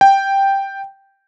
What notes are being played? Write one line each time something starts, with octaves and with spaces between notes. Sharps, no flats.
G5